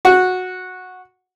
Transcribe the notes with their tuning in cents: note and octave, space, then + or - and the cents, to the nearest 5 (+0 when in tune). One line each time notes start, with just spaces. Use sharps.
F#4 -10